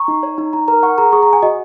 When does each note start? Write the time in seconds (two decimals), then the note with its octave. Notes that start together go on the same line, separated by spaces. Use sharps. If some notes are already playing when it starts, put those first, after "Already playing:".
Already playing: A#5 C#6
0.08 D#4
0.23 C#5
0.38 D#4
0.53 D#4 A#5
0.68 A#4 A#5
0.83 F#5 C#6
0.98 G#4 A#5
1.12 G#4 C#6
1.23 A#5
1.28 F#5
1.33 G#5
1.43 F#4 D#5